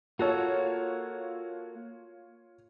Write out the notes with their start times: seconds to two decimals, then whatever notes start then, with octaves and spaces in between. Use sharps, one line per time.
0.19 A#3 F4 F#4 A4 C#5